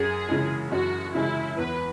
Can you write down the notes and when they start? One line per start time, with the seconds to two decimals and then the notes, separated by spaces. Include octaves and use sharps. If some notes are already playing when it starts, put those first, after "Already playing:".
Already playing: F#2 G#4
0.29 C#3 E3 G#3
0.72 F#2 F#4
1.15 C#3 E3 G#3 E4
1.58 E2 B4